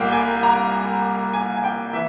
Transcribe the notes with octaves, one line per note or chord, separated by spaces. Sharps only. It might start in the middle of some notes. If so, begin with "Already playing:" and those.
Already playing: C2 A#2 G3 A#3 F5 G5
G#5
A#5
G#5
G#5
G5
E3 E5